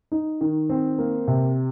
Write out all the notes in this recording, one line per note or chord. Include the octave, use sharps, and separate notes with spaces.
D#4
D#3
C4
A#3
C3